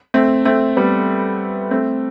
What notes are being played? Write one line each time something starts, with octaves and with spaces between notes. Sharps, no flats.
A3 C4
A3 C4
G3 B3
A3 C4